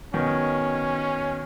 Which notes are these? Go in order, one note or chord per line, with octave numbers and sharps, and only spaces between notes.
B2 D#3 C#4